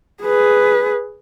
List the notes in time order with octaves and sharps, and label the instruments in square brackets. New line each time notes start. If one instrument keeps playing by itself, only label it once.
[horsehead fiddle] G#4 B4